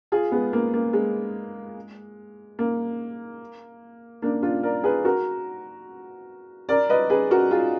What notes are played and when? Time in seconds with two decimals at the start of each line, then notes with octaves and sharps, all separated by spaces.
0.12 F4 G#4
0.32 G#3 B3
0.53 A#3
0.74 A#3
0.93 G#3
2.59 A#3
4.22 A#3 D4
4.43 D4 F4
4.63 A#4 D5
4.84 G#4 B4
5.05 F#4 A#4
6.69 A#4 D5
6.90 B4 D#5
7.10 G#4 B4
7.30 F#4 A#4
7.51 F4 G#4